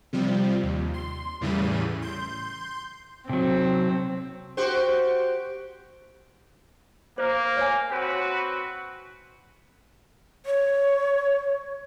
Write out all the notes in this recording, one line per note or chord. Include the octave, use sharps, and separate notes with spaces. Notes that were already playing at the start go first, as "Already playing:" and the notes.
C3 F3 G3
D#2
C6
E2 A2 C#3 E3 G3 D#7
C6 G6
C3 F#3 C4
F#4 G4 C5
A#3 C5
C#5 G#5
C4 F#4 B4
C#5